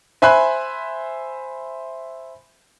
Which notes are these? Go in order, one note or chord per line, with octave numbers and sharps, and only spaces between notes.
C5 E5 G#5 B5 C6 F#6